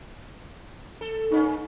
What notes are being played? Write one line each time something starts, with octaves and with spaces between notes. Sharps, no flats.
A4
A#3 C#4 D#4